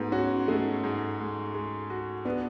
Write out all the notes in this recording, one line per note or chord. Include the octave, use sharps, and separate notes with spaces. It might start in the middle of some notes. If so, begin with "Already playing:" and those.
Already playing: G#2 A3 B3 F#4
C#4 F#4
G#3 A3
G#2
G#3
G#3
F#4
B3 D4